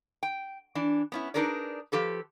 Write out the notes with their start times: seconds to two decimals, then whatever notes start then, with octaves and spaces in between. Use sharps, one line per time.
0.23 G5
0.75 E3 D4
1.12 B3 C#4 E4
1.34 D4 D#4 G#4 A#4 B4 D5
1.92 F3 G4 A4 B4